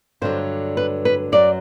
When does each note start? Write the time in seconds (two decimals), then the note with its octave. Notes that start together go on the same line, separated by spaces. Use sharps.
0.21 G2 D3 F#3 C5
0.77 B4
1.05 B4
1.32 F#2 F#3 D5